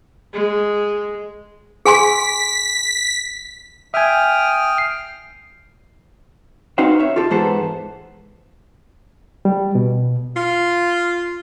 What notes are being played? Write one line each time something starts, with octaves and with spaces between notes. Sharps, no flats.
G#3
G#4 G#5 C6 B6
E5 G5 G#5 D#6 F6
C7
B3 C4 D#4 F#4 C5 F5
C#5 E5
F4 G4 A4
G#2 E3 B3 A4 C5
G3
B2
F4